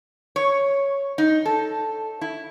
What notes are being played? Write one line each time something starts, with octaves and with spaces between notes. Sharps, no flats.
C#5
D#4
A4
E4